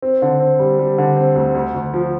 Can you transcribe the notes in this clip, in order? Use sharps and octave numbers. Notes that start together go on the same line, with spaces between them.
C4
D3
C4
G3
G3
D3
C4
D2
D2
D2
F3